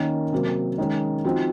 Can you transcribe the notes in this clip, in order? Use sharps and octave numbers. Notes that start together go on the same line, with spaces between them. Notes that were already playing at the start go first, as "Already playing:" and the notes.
Already playing: D#3 A#3 C#4
C3 F#3 A#3
D#3 G#3 C#4
F3 C4 D#4 F#4